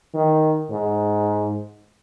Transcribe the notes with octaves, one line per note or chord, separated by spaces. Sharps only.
D#3
G#2